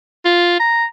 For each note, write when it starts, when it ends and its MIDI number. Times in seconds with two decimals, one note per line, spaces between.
0.25 0.59 65
0.60 0.85 82